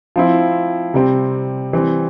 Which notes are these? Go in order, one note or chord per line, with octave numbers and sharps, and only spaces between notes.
F3 C4 E4
C3 G3 C4
E3 G3 C4